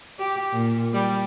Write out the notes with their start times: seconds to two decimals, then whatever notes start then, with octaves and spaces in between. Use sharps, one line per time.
0.18 G4
0.52 A#2
0.93 G3